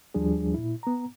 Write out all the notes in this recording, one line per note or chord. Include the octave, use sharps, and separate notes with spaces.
D#2 F3 G3 D4 G#4
A#2 E4
B3 A#5